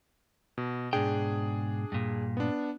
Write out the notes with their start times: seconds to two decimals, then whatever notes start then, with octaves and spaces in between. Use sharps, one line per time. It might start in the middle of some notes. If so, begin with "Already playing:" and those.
0.58 B2
0.93 G#2 B2 D4 G#4 G5
1.92 G2 A#2
2.37 B3 D4